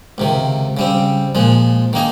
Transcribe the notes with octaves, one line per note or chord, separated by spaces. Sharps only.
C#2 C3 D#3
C#3 G3 C4
A#2 F3 G#3
D#3 A#3 D#4 G#4